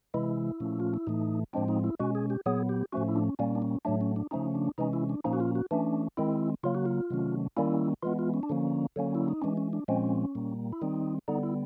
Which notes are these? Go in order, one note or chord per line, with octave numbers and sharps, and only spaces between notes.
C3 E3 G#3 E4
A#2 F3 A3 C#4
F4
E4
A2 E3 A3 D#4
A2 F3 G#3 C4 D4
D#4
E4
B2 G#3 C#4 F#4
G#4
G4
A#2 F#3 B3 G#4
G4
A2 F3 A3 C#4 F#4
E4
D4
C#4
A#2 G3 A#3 C#4
D4
C#4
A2 F#3 A3 D4
C#4
D4
C#3 F3 A3 C#4 D#4
D4
C3 E3 G#3 C#4 D#4
E4
D4
A#2 F3 A#3 C#4 D#4
F#4
F4
F#4
E3 A3 C#4 D4
D#3 G#3 C4 E4
C#3 F#3 A#3 F4
F#4
F4
C3 D#3 F#3 A3 C#4
D#3 G3 A#3 C#4 E4
E3 G#3 B3 F4
F4
C#4
D4
D3 F3 A#3 C#4
D3 F#3 A#3 C#4
E4
D#4
E3 G#3 C#4 D4
C#4
D4
A#2 F3 G#3 C4 C#4
A#2 G3 A#3
E4
D#3 G3 C4 D#4
D3 G3 B3 D#4
E4